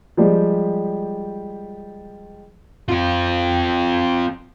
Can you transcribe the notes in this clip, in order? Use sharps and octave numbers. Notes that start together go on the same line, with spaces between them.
F3 G3 G#3 G4
C4 F4